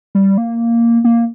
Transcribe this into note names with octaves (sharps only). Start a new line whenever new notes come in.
G3
A#3
A#3